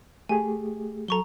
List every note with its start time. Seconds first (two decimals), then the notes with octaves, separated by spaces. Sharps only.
0.29 A3 G4 G#4 G#5
1.08 F#3 A4 A#5 C#6 G7